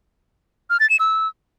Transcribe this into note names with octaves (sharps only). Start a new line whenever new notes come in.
F6
A6
E7
E6